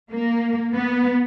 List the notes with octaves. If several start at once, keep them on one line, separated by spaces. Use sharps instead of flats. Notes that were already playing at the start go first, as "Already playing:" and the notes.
A#3
B3